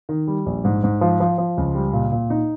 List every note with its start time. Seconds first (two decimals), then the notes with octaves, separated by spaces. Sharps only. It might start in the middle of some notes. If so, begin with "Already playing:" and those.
0.09 D#3
0.27 G3
0.46 A#1
0.65 G#2
0.84 G#2
1.01 F3
1.20 F3
1.38 F3
1.57 C#2
1.75 G3
1.93 A#2
2.12 A#2
2.30 D#4